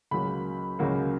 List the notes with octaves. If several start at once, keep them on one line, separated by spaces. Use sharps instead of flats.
C#2 C#3 F#3 A#3 B5
C#2 C#3 F#3 A#3